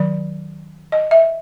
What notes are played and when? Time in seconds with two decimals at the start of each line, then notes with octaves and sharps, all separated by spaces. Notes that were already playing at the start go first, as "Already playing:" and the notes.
Already playing: D#3 F#3 D5
0.92 D#5
1.11 E5